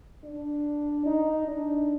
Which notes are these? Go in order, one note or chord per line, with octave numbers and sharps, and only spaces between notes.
D4
D#4
D4